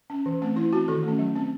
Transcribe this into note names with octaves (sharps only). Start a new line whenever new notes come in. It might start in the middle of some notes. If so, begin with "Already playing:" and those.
C#4
E3
A3 C4
E3 E4
C4 F#4
D#3 A4
A3 C#4
F#3
C4